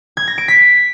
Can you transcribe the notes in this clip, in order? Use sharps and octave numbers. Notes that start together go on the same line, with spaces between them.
G#6
A#6
D7
B6